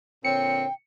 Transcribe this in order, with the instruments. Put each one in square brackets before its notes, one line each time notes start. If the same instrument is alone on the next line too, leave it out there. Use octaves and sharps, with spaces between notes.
[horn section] A#2 D3 C4 [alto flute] C#5 [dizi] G5 [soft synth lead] C#7